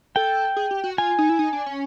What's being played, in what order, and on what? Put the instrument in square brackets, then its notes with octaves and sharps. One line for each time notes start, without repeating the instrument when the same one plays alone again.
[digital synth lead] A4 [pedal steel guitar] G5
[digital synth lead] G#4
G4
F#4
[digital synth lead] F4 [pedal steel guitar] G#5
[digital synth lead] D#4
E4
D#4
D4
C#4